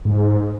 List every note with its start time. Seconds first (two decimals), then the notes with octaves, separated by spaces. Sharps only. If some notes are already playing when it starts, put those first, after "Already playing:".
0.05 G#2